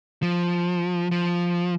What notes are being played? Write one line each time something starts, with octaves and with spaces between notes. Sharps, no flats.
F3
F3